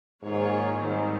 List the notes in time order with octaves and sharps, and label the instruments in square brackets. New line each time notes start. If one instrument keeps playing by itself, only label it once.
[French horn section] G#2 [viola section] D#3 A#3 F4 G#4 C#5
[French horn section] G#2 [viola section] D#3 G3 C4